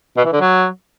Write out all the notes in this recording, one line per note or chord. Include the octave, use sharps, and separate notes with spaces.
B2
E3
D3
F#3